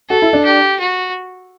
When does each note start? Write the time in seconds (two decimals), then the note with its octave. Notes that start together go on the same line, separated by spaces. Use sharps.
0.10 F#4 A4
0.22 E4
0.33 D4
0.45 G4
0.80 F#4